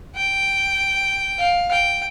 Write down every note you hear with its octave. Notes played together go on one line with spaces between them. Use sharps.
G5
F5
G5